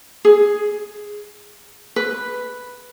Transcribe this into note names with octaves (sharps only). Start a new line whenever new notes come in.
G#4
B4